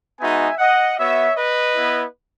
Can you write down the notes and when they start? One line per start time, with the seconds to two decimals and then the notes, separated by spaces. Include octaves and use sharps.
0.20 G#3 B3 D#4 F#4 E5 G#5
0.59 D#5 F#5
0.98 B3 F#4 C#5 E5
1.36 B4 D#5
1.75 B3 E4